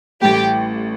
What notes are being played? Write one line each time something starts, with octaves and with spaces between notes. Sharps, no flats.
A1 A2 G3 G4